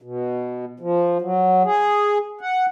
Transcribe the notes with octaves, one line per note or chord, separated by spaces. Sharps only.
B2
F3
F#3
G#4
F#5